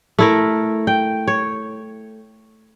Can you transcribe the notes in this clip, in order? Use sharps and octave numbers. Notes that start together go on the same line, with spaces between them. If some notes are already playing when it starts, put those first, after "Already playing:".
A3 E4 A#4
G5
C#5